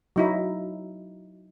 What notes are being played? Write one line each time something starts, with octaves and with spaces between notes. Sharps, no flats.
F#3 D#4 E4